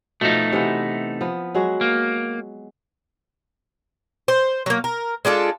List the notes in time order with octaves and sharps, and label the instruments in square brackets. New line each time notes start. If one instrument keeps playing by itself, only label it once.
[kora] B2 F3 [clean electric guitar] A3 D#4
[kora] C3 E3 B3
F3 B3
F#3 G#3 F#4
[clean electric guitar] A#3
[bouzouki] C5
F#3 A#3
A#4
G#3 D4 F4 A4